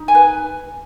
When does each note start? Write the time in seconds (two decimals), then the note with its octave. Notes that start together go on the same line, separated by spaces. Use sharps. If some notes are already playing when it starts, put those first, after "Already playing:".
Already playing: D#4
0.08 G#5
0.15 B4